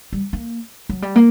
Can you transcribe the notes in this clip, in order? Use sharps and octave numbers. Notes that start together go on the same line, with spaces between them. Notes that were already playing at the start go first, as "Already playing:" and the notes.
G3
A#3
F#3
G3
A#3